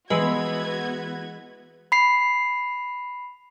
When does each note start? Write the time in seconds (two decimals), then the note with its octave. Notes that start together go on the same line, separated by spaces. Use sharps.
0.10 E3 G#3 B3 F#4 B4 G#6
1.92 B5 C7